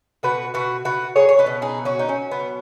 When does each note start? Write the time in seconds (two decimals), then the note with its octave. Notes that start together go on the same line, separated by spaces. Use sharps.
0.23 B2 F#4 B4
0.54 B2 F#4 B4
0.85 B2 F#4 B4
1.16 F#3 G#4 C#5
1.29 C#5
1.39 B4 D#5
1.46 B2
1.62 D#4 G#4
1.78 F#3
1.85 C#4 F#4
1.99 D#4
2.08 F#3 C#4
2.31 B3
2.39 B2